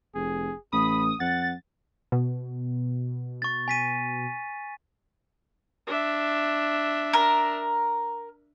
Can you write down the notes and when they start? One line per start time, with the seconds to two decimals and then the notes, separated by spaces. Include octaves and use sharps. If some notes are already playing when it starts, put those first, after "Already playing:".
0.15 F1 G#4
0.72 A1 B5 D#6
1.20 F2 F#5 A6
2.12 B2
3.42 C#6 A6
3.68 G#5 B6 D#7
5.87 D4 E5
7.13 A#4